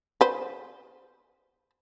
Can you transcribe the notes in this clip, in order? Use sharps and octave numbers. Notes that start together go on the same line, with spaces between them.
B4 C5